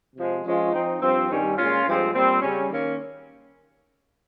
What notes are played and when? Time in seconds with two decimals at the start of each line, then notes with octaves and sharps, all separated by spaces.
0.16 C3 F3 G#3
0.44 F3 G#3 C#4 F4
0.72 F3 C4 D#4
1.00 G2 F3 C4
1.29 G2 D#3 G3 C#4
1.56 A#2 G#3 C#4 F4
1.85 G2 F3 G#3 C4
2.13 A#2 G3 C4
2.41 C#3 G3 C#4
2.69 D#3 A#3 C#4